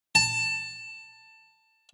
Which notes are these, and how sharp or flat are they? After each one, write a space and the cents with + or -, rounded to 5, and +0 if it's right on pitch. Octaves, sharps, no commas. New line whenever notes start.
A5 +15